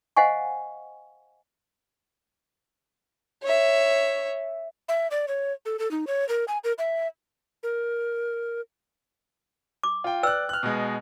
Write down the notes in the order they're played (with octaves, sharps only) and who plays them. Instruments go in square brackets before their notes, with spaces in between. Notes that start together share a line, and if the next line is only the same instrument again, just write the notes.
[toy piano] C5 D#5 F5 F#5 G#5 C#6
[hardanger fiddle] C#5 E5
[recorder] E5
D5
C#5
A4
A4
D#4
C#5
A#4
G#5
A#4
E5
A#4
[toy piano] D6
[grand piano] F4 G5
[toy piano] B4 G5 E6 [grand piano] D5 F#6
[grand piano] F6 F#6
B2 G#3